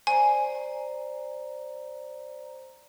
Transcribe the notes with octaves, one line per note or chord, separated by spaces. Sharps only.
C5 D5 G#5 A#5